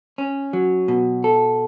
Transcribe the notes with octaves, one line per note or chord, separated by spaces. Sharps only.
C#4
F#3
B2
A4